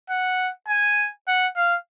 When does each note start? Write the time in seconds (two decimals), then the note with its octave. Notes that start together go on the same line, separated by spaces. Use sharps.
0.10 F#5
0.68 G#5
1.27 F#5
1.56 F5